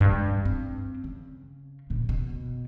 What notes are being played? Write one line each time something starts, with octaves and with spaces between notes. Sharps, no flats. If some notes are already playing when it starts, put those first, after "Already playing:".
G2 G#3
C4
C#3
D2 A#2
B2